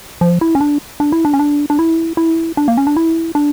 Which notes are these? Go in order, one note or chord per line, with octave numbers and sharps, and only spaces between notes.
F3
E4
C#4
D4
D4
E4
D4
C#4
D4
D4
E4
E4
D4
A#3
C#4
D4
E4
D4